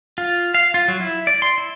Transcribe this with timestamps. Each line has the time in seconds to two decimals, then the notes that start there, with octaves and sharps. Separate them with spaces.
0.18 F4
0.54 F5
0.74 F4
0.88 F#3
1.00 E4
1.27 D5
1.42 C6
1.58 E4